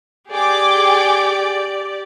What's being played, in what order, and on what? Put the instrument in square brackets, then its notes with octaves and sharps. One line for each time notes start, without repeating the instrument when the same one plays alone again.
[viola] G4 D5 [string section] G#4 G5 D6